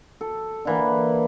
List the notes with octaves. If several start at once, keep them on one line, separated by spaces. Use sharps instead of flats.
A4
D3 E3 A#3